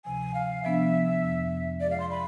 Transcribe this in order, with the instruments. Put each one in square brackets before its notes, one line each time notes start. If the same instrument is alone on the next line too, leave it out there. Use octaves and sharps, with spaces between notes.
[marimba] D2 C3 F3 [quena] G#5
[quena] F5
[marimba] C3 F3 B3 D4 [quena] E5
[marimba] F2 C3 F3
[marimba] F3 G#3 B3 F4 G#4 [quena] D5
[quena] F5
C6
B5